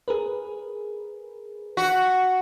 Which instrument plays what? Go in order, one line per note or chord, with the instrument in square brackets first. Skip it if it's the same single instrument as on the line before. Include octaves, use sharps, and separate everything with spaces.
[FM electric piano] G#4 A#4 B4
[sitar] F#4 [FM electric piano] B6